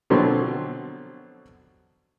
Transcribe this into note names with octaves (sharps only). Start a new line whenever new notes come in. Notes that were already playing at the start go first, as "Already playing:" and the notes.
B2 D3 F3 F#3 C4 C6